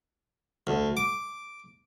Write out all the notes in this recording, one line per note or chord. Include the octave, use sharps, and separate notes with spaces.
D2
D6